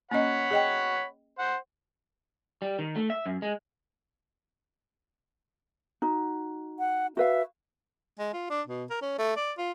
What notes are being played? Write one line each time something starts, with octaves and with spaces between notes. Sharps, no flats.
A#3 C#4 C#5 D#5 F#5 B5
G#4 D#5 G5
C5 F#5
G3
D#3
A3
E5
F#2
G#3
D#4 F#4
F#5
F#4 B4 E5 F5
G#3
F4
D4
B2
A#4
C#4
A3
D5
F4